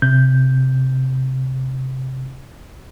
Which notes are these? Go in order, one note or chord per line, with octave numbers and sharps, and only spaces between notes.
C3 G6